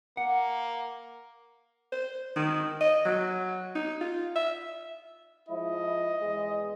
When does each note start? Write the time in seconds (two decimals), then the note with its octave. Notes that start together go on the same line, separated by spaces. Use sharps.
0.17 A#3 F#5
1.92 C5
2.36 D#3
2.81 D#5
3.06 F#3
3.75 D#4
4.01 F4
4.36 E5
5.49 F3 G#3 E4 D#5
6.21 E2 G#3